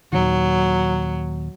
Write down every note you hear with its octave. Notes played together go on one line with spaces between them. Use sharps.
D#2 A#2 D#3 F#3